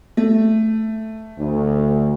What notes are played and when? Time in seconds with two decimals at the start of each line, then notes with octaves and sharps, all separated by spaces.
0.17 A3
1.39 D2